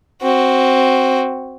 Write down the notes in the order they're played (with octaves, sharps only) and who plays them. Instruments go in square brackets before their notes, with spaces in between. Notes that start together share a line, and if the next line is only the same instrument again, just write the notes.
[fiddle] C4 F#4